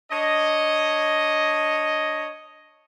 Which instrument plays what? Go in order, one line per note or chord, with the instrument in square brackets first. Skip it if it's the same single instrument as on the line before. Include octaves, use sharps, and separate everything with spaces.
[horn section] D4 C#5 D#5